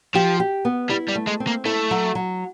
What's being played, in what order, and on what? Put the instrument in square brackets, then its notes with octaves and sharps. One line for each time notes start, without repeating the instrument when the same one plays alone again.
[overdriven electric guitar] F3 [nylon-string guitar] G4
[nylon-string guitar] G4
B3
[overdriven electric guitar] G3 [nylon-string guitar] E4
[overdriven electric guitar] G3
[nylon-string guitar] A3
[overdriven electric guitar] G#3
[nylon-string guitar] C4
[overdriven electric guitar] A#3
[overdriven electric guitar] A3 [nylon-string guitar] E4
[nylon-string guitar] F#3
F#3